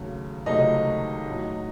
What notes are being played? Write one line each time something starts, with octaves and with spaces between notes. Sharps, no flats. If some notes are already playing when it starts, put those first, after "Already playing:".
Already playing: D#2 C#3 F#3 A3
C#2 C3 D#3 F#3 A3 D#4 D#5
A1 A2 F#3